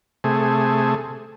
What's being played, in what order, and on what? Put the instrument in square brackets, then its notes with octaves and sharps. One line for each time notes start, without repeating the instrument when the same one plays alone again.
[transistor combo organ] C3 A3 G#4